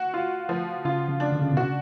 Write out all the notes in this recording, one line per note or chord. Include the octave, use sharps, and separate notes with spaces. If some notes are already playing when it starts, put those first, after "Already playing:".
Already playing: F#4
F4
F3
C#3 F4
C#3
D4
D3
C#3
B2 F#4
C#3